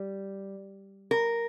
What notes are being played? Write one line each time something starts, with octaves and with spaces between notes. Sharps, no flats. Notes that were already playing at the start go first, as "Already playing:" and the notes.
Already playing: G3
A#4